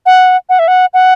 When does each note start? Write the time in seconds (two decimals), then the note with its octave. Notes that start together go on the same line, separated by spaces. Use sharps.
0.06 F#5
0.49 F#5
0.59 E5
0.68 F#5
0.94 F#5